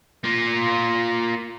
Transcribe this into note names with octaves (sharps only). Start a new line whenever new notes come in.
A#3 F4